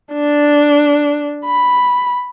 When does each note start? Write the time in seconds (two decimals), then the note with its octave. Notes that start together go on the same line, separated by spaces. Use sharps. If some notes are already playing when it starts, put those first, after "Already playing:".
0.13 D4
1.46 B5